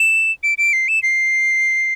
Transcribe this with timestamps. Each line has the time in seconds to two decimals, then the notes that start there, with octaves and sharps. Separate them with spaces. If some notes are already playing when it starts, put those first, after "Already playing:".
Already playing: E7
0.43 D7
0.58 D7
0.73 C7
0.88 E7
1.03 C7